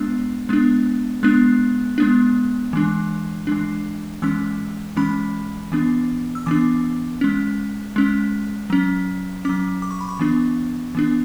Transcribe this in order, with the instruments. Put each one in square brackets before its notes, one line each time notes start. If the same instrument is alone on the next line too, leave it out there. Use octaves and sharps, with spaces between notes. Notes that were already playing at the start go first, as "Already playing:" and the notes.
Already playing: [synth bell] G#3 B3 D4 E6
G#3 B3 D4
G#3 B3 D4 F#6
G#3 B3 D4
E3 G#3 D4
E3 G#3 D4
E3 G#3 C#4 E6
E3 G#3 C#4 B5
E3 B3 D4
E6
E3 B3 D4 D6
G#3 C#4
G#3 C#4
F#3 C#4
F#3 C#4 D6
D6
C#6
B5
C#6
E3 B3 D4
E3 B3 D4